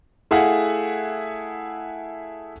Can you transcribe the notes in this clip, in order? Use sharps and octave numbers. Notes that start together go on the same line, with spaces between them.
A3 E4 G#4 F5 F#5